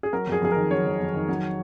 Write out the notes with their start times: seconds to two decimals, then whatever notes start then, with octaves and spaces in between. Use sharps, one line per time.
0.03 G#4
0.13 F#3 A#4
0.27 F2 G#4
0.42 F2 G#4
0.51 D#3 A#4
0.71 F#3 C#5
0.85 F2
1.00 F2
1.14 D#3
1.29 F#3